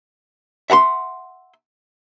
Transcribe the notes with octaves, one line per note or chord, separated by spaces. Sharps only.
E5 F#5 A#5 C6